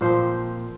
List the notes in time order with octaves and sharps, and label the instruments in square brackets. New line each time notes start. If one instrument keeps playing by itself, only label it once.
[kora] A#2 F3 C4 C5